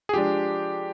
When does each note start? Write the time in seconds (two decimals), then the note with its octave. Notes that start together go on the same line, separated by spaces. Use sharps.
0.09 G#4
0.14 F3 G#3 D4 G4